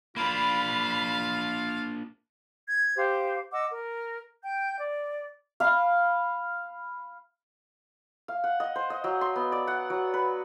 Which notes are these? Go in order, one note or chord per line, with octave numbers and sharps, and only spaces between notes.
A#3 D4 F4 F5 B5
G#6
G4 C5 F5
D#5 F#5 D6 E6
A#4
G5 G6
D5
F5 B5
F5
F#5
D#5
C5
D#5
F#3
C6
B3
D5
F#5
F#3
B4